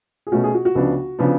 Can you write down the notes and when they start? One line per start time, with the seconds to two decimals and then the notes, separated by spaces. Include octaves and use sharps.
0.27 G#4
0.32 B2 A3 C#4 F#4
0.44 G#4
0.54 F#4
0.65 F#4
0.75 C#2 C#3 F3 B3 D4
1.19 C#3 F3 B3 D4